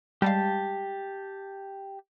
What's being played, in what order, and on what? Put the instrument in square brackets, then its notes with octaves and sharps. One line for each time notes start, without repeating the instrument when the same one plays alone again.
[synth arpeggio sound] G3 G#3 F5 [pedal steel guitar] G4 A5